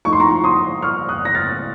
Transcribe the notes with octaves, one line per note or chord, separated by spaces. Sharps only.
F3 A3 D#4 C#6
C6
A#5 C#6
C6 D#6
C#6 F6
D#6 F#6
A#6
F6 A6